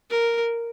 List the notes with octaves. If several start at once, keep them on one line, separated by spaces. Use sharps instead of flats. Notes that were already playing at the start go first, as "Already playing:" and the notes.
A#4